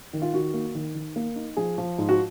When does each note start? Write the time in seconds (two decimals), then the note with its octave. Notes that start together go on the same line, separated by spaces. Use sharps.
0.13 D#3
0.22 F4
0.34 D#3 F#4
0.54 A#3
0.75 D#3
0.95 D#3
1.16 A#3
1.36 D#4
1.57 F3 G#4
1.78 F3
1.98 G#2
2.09 F#4